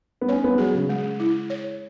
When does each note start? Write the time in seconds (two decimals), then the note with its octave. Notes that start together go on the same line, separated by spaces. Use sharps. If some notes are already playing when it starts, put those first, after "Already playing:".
0.21 B3
0.28 C#4 C#5
0.44 B3
0.58 F#3 G#4
0.74 C#3
0.89 G#3
1.20 E4
1.50 C#5